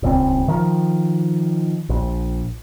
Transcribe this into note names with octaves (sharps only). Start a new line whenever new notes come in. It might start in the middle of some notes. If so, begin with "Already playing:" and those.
D#1 C#2 C4
D#3 F3
A#1